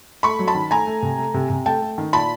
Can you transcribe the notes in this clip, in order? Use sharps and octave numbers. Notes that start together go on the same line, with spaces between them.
A3 B5 C#6
F#3
A5 B5
D#3
A3 G#5 A#5
A3
C3
A3
C3
C3
A3 G5 A5
A3
D#3
A#2 A5 B5